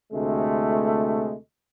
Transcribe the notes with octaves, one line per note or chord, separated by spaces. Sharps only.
D2 C3 G#3 A3